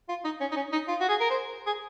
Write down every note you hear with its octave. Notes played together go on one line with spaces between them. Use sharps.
F4
D#4
C#4
D#4
C#4
D#4
F4
F#4
G#4
A#4
C5
G#4